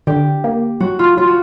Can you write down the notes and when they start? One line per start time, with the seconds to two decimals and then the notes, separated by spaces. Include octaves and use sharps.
0.07 D3 G4
0.44 A#3
0.80 F#3 F#4
0.99 F4
1.17 F#3 F4
1.27 F#4